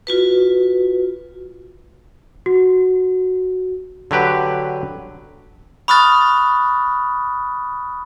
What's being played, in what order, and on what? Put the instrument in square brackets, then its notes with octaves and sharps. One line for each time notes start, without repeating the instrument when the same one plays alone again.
[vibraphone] F4 F#4 B4
[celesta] F#4
[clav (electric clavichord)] D3 F#3 G4 B4
[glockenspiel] B5 C#6 D#6 F6 F#6 A6